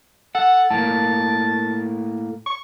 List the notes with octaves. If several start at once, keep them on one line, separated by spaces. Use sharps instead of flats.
A4 F#5
A2 A#3 A5
C#6